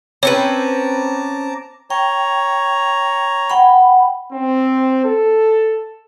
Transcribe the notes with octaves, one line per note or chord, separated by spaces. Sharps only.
C4 C#4 B4 C#5 A5 A#5 D6
C#5 G5 A#5
F#5 G5 B5
C4
A4